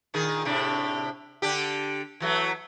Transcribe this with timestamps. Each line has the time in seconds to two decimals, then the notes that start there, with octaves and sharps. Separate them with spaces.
0.14 A#2 D#3 G#4
0.45 A2 C3 D4
1.42 D3 D4 G4
2.20 E3 F#3 A3